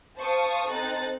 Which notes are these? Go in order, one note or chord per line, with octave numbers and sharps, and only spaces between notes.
C5 F5 A5 C#6 D#6
C4 D#4 A4 F#6 A6